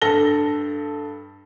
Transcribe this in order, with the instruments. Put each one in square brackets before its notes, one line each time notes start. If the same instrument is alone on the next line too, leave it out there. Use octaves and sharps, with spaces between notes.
[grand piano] G2 A4 A#6 G7